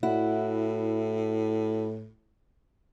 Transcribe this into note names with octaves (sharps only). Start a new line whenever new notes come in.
A2 E4 F#4